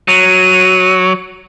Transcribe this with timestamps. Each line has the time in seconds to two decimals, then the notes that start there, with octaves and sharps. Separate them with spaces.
0.08 F#3 D#7